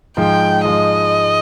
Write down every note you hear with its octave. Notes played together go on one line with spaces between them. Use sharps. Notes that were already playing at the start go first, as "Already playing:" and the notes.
G#2 F3 G#3 G5
G#2 F3 G#3 D#5